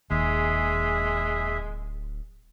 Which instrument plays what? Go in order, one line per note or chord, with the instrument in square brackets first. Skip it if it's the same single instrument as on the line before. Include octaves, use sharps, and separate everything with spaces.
[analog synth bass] D1 [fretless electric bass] D#2 [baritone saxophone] G#3 [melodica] G#4 E5